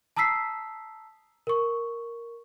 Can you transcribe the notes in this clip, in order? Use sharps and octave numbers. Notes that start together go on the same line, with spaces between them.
A5 A#5 D#6 E6 B6 C7
A#4 C#6